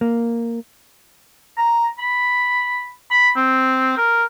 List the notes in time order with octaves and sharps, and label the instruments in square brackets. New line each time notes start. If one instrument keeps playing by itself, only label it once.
[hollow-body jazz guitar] A#3
[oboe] A#5
B5
B5
C4
A#4